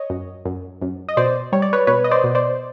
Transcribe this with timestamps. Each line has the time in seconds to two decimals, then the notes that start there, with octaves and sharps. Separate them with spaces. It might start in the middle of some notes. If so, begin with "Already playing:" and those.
Already playing: C#5 D#5
0.10 F#2
0.45 F#2
0.82 F#2
1.09 D#5
1.17 B2 C5 D5
1.52 G3 C#5
1.62 D5
1.73 B4 C#5
1.87 B2 B4 C#5
2.04 D#5
2.11 C5 D5
2.24 B2
2.35 C5 D5